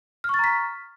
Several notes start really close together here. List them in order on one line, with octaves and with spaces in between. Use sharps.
F6 C#6 A6 A#5 B6